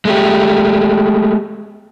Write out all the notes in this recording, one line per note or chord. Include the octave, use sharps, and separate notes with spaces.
G#3 A3 G4